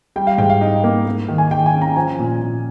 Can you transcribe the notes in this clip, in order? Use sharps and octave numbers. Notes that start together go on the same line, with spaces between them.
G3 G5
F5
G#2 G5
F5
D#4
A#3
A#3
D#3
G#5
D#3 G5
G#5
C#4
A#5
F3 G#5
A#2
A#2